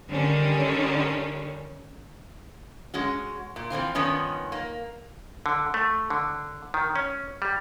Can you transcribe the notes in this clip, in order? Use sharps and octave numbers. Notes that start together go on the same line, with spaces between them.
D3 D#3 G3 C#4
G#3 C#4 F#4
A#2
E3 F3 C4 F4
G2 D#3 F3 B3 C#4 D#4
A#3
D3
A3
D3
D#3
C#4
G3